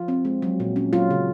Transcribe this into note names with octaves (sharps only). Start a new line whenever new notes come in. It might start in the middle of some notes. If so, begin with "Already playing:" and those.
Already playing: F3 F4
C4
G#3
F#3
A#2
C#4
F#3 F4
C#3